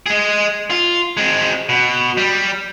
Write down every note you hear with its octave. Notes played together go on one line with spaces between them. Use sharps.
G#3 G#4
F4
G#3 C4
B2
G3